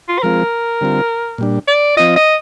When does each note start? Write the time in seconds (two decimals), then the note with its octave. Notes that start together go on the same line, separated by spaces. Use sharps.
0.09 F4
0.18 C5
0.23 F3 G#3 C4 F4 A#4
0.81 D3 G3 C4 F4
1.38 A#2 G3 D4
1.68 D5
1.97 F3 C4 F4 D#5
2.16 D#5